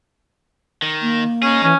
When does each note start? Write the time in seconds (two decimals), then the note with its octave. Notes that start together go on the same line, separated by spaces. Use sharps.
0.82 D#3
1.02 A#3
1.43 C#4 D#4 G#4
1.63 E3 C#4